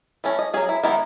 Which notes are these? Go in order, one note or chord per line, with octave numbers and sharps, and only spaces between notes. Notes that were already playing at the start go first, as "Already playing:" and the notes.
E3 A3 C#4
D#5
F#3 C#4 G#4
E4
D#3 G#3 B3 D#4 E4